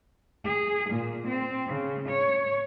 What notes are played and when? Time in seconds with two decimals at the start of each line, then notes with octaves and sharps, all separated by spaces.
0.44 G#4
0.90 A#2
1.27 C4
1.67 C#3
2.09 C#5